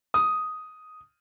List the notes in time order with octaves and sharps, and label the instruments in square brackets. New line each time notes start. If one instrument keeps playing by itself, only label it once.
[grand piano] D#6